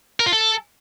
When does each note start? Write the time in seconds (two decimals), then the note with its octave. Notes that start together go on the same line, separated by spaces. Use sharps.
0.20 A#4
0.26 F4
0.33 A4